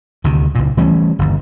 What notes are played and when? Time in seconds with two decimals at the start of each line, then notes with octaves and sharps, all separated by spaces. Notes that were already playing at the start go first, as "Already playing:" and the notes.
0.24 D2 C3 D#3
0.55 C#2 A#2
0.77 E3 G3 A3 C#4
1.19 G1 D#2